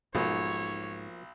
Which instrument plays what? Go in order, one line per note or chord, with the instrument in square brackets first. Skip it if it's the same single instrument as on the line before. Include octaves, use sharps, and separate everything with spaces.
[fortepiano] B1 [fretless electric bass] G#2 [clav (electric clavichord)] F3 A#3 [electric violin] C#5